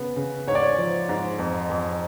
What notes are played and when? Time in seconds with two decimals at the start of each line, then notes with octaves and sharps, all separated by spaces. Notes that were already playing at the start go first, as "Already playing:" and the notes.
Already playing: C#3 B3
0.16 C#3
0.47 G#2 C#5
0.55 D5
0.63 C#5
0.78 F3
1.09 G#2
1.38 F2
1.70 F2